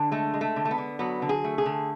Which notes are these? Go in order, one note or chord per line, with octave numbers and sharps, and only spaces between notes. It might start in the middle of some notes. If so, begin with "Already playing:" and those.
Already playing: D3
G#3 A3
G#3
A3
D3
A3
B3
D3
F#3 B3
D3
G#4
A3
G#4
D3